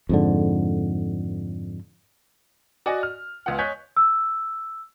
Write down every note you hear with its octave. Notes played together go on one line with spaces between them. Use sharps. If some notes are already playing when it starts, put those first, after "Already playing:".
F2 G#2 D3
F#4 D5 D#5 F#5 G#5
F6
C#2 B3 F4 F#5
C#5 D#5 G#5 F#6 G6 B6
E6